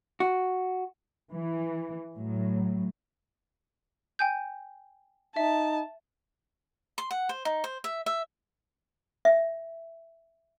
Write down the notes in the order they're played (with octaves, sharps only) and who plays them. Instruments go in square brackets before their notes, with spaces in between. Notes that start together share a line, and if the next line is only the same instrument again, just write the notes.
[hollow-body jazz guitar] F#4
[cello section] E3
A2 F#3
[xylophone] G5 G#5 G6
[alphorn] D#4 [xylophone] E5 [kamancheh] A5
[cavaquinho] C6
F#5
C5
D#4
C5
E5
E5
[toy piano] E5